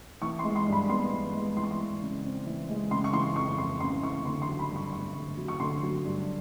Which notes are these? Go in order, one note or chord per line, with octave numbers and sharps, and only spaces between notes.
E3 C#6
C6
G#3
C6
G2
B5
B3 C6
E3
G#3
E3 C6
C#6
C6
G#3
C#3
C4
E3
G#3
C#3 C6
C#6
E3 C6
F2 C#6
F2 C6
C#3 C6
E3 C#6
D3 C6
C6
F#3
B5
G2
C#6
G2 C#6
D3
F#3
C#6
D3 C6
F#3
G2